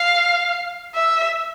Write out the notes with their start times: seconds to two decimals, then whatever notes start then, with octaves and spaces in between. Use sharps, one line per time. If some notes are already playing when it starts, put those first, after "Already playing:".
Already playing: F5
0.95 E5